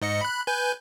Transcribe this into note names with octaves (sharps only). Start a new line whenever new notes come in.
G#2 D#5 C#7
B5 F#6
B4 G#5 G6